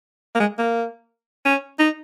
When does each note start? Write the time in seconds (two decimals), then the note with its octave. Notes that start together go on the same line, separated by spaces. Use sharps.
0.35 A#3
0.40 G#3
0.58 A#3
1.45 C#4
1.79 D#4